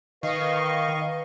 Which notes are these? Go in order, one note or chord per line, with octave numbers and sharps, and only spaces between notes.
D#3 B4 D#5 F5 C#6